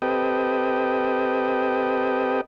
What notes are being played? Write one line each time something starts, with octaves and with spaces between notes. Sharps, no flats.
C4 G4 A4 B4 D#5 G5